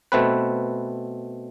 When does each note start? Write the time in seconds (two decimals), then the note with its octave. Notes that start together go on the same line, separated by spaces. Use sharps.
0.12 B2 A3 C4 B4